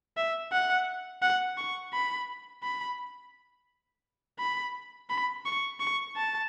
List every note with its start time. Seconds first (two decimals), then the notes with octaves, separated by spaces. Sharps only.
0.17 E5
0.52 F#5
1.22 F#5
1.57 C#6
1.94 B5
2.63 B5
4.39 B5
5.10 B5
5.45 C#6
5.80 C#6
6.16 A5